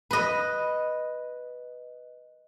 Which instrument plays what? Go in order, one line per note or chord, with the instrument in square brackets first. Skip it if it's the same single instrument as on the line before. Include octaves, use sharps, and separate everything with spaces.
[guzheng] B4 D#5